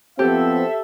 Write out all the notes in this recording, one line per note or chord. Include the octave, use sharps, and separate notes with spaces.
F3 B3 C4 G4 A4 E5